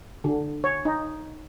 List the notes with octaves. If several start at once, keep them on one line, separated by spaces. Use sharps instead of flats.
D3
C#5
D#4